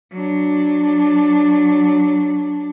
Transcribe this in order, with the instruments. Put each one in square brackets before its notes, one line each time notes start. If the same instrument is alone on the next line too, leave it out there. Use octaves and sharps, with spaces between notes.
[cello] F#3 D4